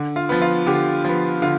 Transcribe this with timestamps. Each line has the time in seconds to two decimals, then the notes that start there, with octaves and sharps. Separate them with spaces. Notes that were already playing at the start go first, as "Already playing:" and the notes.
Already playing: D3
0.16 F4
0.29 F3 B3
0.42 F4
0.67 D3 G4
1.05 F3 B3
1.42 D3 F4